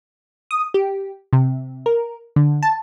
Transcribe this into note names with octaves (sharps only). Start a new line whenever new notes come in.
D#6
G4
C3
A#4
D3
A5